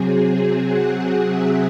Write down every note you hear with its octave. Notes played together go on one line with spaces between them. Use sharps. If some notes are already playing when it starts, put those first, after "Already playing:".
Already playing: C3 F#3 C4 G#4
G#4
F#5
F#5
E5